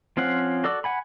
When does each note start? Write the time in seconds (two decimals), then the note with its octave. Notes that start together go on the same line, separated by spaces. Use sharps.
0.17 F3 C4 C#4 F5 F#5
0.64 F#4 A4 D5 E6
0.84 F#5 G#5 B5